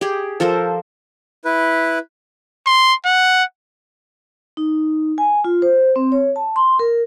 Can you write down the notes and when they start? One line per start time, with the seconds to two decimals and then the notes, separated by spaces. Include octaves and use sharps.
0.01 G4 G#4
0.40 F3 A4 A#4 C5
1.45 E4 B4
2.67 C6
3.06 F#5
4.57 D#4
5.18 G#5
5.44 F4
5.62 C5
5.96 C4
6.12 C#5
6.36 A5
6.56 C6
6.79 A#4